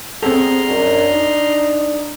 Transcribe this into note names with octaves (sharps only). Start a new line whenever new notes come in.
G3 B3 C4 G#4 A4 A#5 C6 F6
F#2 D4
D#4